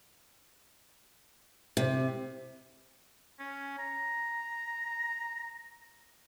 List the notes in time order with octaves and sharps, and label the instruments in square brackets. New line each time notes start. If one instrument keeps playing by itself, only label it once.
[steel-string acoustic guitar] C3
[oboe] C#4
A#5